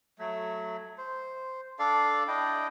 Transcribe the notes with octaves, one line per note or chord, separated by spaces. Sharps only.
F#3 A3
C5
D4 A4 D5 F5
D4 E4 D#5 G5